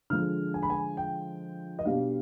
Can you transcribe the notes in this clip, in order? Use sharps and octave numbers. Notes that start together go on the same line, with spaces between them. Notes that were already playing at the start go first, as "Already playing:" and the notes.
D3 F3 G#3 F6
G#5
B5
G#5
G5
D#5
B2 G3 D4 F5